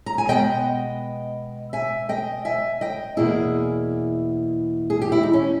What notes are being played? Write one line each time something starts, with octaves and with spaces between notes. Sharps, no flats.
A#5
G#5
B2 G#3 B3 D#5 G5
E5 G#5
D#5 G5
E5 G#5
D#5 G5
E2 B2 A#3 E4 G#4
G#4
G4
E4
D#4
C#4